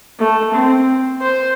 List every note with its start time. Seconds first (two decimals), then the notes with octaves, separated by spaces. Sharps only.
0.19 A3
0.54 C4
1.21 C5